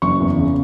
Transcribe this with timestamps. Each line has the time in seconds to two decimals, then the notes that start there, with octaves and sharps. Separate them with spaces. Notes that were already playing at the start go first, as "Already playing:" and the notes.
0.02 F#1 C#6
0.20 E2
0.38 C#3